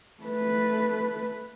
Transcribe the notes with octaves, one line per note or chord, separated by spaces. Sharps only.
A3 B4